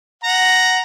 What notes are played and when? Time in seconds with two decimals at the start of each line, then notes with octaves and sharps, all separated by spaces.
0.24 F#5 A#5